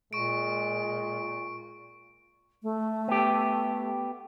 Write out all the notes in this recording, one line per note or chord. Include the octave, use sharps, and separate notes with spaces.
A#2 G#3 C#6 D7
A3
B3 G4